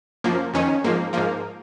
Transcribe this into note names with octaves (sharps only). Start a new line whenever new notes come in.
F#2 F3 A#3
F2 D#3 C#4
G#2 F3 A#3
G#2 F3 A#3